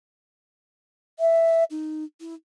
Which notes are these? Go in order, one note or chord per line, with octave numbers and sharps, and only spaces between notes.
E5
D#4
E4